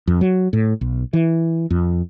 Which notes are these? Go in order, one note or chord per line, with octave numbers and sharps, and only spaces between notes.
F2
F#3
A2
B1
E3
F2